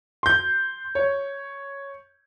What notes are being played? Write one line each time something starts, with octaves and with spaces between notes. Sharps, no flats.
C6 G6
C#5